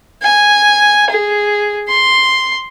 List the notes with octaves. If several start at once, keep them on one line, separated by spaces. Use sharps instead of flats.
G#5
G#4
C6